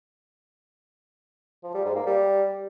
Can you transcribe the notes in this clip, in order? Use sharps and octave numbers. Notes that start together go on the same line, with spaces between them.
F3
G3
G#2
A#3
G3